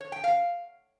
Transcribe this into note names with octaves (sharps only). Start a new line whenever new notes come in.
C#5
G5
F5